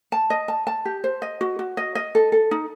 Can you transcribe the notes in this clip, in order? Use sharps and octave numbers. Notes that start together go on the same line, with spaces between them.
A5
D#5
A5
A5
G4
C5
D#5
F#4
F#4
D#5
D#5
A4
A4
D#4